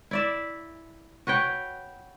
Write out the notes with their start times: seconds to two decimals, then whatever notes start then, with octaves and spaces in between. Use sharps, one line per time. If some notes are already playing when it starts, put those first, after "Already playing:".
0.11 E4 D5 E5
1.27 F#4 B4 C#5 G5